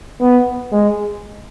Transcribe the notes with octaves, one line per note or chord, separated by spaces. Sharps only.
B3
G#3